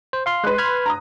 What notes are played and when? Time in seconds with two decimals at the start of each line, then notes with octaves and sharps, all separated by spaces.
0.13 C5
0.26 F5 C6 F6
0.44 G#3 B4 C6 F#6
0.58 B5 F6 G#6
0.86 A#5 D#6